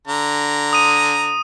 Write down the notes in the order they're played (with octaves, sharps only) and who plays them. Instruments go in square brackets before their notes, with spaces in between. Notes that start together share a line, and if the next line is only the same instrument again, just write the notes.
[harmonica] D3 A#5
[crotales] D#6 D#7